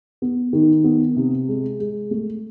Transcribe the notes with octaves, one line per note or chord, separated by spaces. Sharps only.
B3
D#3
B3
C3
G#3
G#3
A3